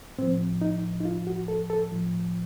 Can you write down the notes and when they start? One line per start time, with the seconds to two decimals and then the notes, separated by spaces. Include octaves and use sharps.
0.18 A2 F3 C4
0.61 D#4
1.00 D#4
1.05 F4
1.27 F#4
1.48 A4
1.70 A4
1.92 A2 F3